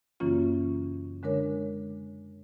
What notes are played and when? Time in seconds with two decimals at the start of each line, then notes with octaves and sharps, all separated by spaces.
0.20 F#2 C#3 E3 A#3 C#4 F4
1.23 D3 G#3 D4 A#4 C#5